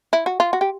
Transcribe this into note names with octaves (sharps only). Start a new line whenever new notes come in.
E4
F#4
F4
F#4
G4